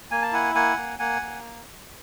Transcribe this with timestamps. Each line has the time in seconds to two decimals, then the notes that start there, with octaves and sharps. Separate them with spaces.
0.11 A#3 G#5
0.22 A5
0.32 E4 F#5 G#5
0.55 A#3 F#5 G#5
0.77 A#3
0.99 A#3 F#5 G#5
1.22 A#3